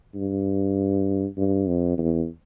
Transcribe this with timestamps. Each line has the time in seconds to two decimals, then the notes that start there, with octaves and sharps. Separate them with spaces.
0.15 G2
1.38 G2
1.67 F2
1.98 E2